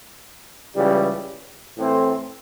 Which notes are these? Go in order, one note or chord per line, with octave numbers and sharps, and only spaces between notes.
C#2 C#3 E3 G3
A2 E3 A3 C4 E4